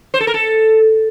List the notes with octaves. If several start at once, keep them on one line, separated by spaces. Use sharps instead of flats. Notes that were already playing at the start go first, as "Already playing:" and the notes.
C5
A4
A#4
A4